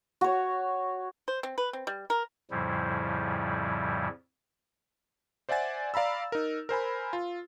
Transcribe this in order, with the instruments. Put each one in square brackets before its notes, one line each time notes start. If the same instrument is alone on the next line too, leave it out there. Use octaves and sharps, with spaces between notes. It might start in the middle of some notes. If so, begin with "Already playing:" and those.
[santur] F#4 C#5
[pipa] C5
C4
B4
C4
G3
A#4
[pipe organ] F2 A2 C#3 F3 G3 E4
[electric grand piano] C5 D5 E5 F#5 G#5 A6
D5 F5 A#5 B5 E6
D#4 A#4
A#4 C5 G#5 B5
F4